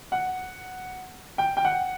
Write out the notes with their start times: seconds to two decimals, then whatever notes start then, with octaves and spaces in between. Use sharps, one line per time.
0.12 F#5
1.38 G5
1.57 G5
1.65 F#5